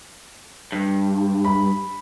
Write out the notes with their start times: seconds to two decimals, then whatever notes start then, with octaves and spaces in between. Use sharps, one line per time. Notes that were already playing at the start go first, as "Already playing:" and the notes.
0.72 G2
1.45 B5